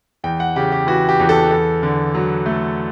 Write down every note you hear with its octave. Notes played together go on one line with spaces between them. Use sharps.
E2 G5
F#5
C#3 G4
G4
E3 F#4
G4
E2
A4
E2 A4
D3
F#3
A3